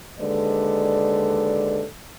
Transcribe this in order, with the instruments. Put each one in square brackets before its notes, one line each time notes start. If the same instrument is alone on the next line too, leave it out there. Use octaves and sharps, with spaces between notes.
[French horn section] D#2 D3 G#3 A4 B4 D5